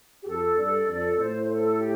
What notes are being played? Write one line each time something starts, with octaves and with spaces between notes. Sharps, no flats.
G4
F2 A4
G2 A4 D5
F2 A4 D5
D5
A2 C5
C5
A4
G4